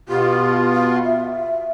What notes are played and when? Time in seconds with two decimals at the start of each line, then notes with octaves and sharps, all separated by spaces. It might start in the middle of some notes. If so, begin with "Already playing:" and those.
0.09 B2 B3 F4 G4
0.74 F5
1.05 E5